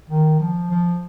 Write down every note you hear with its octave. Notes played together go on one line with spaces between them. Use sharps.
D#3
F3
F3